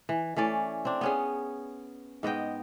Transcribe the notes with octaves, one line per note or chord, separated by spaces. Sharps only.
E3
E3 A3 C#4 D5
C4 D4
B3 C#4 G#4
G#2 B3 D#5 G5